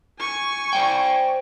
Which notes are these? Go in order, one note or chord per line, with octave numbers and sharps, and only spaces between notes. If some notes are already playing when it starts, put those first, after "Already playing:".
G#5 C#6
C5 D5 G5